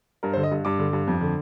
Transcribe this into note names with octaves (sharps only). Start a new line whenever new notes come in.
G2 A#4
C5
D3
D#5
G2
G2 D6
D3
G2
F2
D3